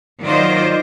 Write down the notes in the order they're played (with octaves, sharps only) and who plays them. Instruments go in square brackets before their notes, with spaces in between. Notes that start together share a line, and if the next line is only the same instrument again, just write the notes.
[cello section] D#3 F#3 F4 C5 D5 D#5